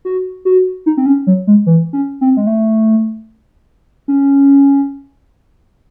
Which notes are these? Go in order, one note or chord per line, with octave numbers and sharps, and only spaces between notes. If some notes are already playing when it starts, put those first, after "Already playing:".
F#4
F#4
D#4
C4
C#4
F#3
G#3
E3
C#4
C4
G#3
A3
C#4